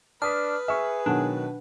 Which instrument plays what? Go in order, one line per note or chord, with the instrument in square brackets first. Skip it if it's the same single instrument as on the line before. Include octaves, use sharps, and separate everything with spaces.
[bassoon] D4 [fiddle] B4 [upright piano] A5 D#6 B6 [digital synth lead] F6
[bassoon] G#4 [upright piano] E5 C#6
[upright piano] B2 D#3 F#3 [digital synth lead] D4